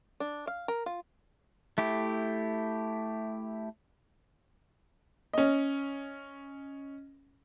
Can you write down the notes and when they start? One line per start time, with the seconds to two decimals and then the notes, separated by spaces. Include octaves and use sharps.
0.20 D4
0.47 F5
0.68 A#4
0.86 F4
1.78 A3 E4 G4
5.33 C#4 D#5